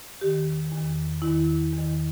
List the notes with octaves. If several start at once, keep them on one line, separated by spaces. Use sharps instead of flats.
E2 D#3 G4
E2 D#3
E2 D#3 E4
E2 D#3